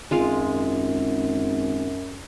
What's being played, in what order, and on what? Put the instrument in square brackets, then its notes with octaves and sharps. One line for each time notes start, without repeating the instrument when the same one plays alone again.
[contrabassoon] G#1 [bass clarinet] F#2 [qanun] G#3 F4 F5